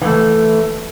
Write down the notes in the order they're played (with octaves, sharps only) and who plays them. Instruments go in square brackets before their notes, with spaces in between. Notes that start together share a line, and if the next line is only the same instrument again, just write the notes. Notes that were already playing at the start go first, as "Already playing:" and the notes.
[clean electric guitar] E3 A3